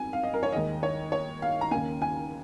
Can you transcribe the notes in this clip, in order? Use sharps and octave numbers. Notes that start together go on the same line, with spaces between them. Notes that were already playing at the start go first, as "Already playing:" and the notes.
Already playing: F2 G#5
F5
D#5
A#4
C#5
D#2 D#3 G#3 D#5
C#5
C#5
F5
A#5
D#2 C#3 A#3 G#5
G#5